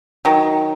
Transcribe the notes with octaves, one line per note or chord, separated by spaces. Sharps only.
D#3 F#3